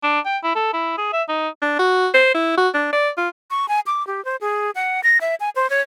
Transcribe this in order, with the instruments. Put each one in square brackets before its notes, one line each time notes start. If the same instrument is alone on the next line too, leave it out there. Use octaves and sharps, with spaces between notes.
[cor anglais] D4
G5
E4
A4
E4
G#4
E5
D#4
[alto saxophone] D4
F#4
C5
E4
F#4
D4
D5
F4
[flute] C#6
G#5
D6
G4
C5
G#4
F#5
A#6
E5
G#5
C5
C#5